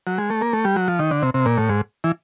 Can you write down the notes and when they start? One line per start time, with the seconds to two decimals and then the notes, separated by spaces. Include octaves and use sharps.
0.07 F#3
0.18 G#3
0.30 A3
0.41 A#3
0.53 A3
0.64 G3
0.76 F#3
0.88 F3
0.99 D#3
1.11 D3
1.22 C3
1.34 C3
1.46 A#2
1.58 A2
1.69 G#2
2.04 E3